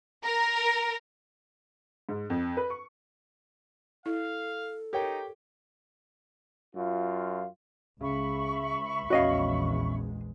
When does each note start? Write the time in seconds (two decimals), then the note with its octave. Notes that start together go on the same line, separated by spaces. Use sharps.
0.24 A#4
2.09 G#2
2.30 F2
2.57 B4
2.70 C#6
4.06 E4 A4 F5
4.93 D#4 G4 A#4 C#5 G5
6.76 F#2 F4
8.01 C#2 C#3 E5 B5 C#6
9.10 A#1 E2 G#3 C#4 F#4 D#5 F5